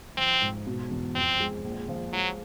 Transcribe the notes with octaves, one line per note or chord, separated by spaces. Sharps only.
F3 C4
G#2
B2
E2
F2 C4
G#3
A#1
F3
F#3 G#3